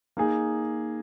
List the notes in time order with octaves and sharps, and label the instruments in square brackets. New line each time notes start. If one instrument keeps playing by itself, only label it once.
[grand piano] A#3 D#4 G#4